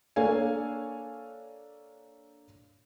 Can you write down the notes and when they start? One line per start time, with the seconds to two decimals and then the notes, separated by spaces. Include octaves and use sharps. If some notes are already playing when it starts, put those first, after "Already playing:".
0.16 A#3 D4 A4 C#5 F5 G#5